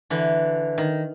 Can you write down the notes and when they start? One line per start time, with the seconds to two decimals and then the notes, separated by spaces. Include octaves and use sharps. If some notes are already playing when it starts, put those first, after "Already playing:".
0.10 D3 E3
0.78 D#3